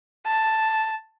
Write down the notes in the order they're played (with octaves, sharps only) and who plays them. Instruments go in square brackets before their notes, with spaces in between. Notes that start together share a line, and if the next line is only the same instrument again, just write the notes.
[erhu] A5